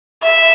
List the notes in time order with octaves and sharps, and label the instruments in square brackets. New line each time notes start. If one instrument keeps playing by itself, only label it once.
[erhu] E5